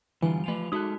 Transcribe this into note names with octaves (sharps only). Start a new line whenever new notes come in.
D3 E3 G3 F4 G#5
F3 A3 F4 B4 F7
G#3 D#4 F#4 A4 D#6 F#6